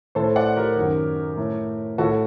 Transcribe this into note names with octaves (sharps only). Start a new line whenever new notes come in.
A2 A4 C5
D5 F#5
G4 A#4
F#2 D#3
A2
A2 F#4 A4